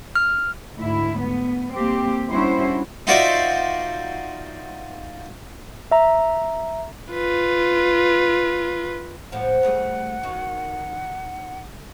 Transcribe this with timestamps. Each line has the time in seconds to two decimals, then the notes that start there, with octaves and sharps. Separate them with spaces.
0.15 F6
0.77 D2 G#2 E4
1.21 B3
1.73 G3 A#3 C4 G4
2.29 G3 C#4 D4 E4 F#4 C5
3.07 D#4 F4 F#4 C5 D5 E5
5.91 E5 A#5
7.13 F4 B4
9.32 A2 F3 F#5
9.63 G3 A3 G#4
10.23 D#3 F#4